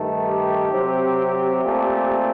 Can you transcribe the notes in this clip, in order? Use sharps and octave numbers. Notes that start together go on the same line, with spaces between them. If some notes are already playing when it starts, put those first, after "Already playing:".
Already playing: G2 D#3 A3
G4
C3 F#3 C4
A#2 A3 C4